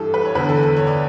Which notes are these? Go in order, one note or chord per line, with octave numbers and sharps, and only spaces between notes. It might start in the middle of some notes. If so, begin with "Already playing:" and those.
Already playing: G2 E3 G4 A4
B4
C#5
E2 D3 B4
A4
A4
C#5
D5